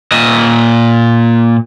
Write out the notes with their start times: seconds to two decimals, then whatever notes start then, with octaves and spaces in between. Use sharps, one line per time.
0.12 A#2 D#5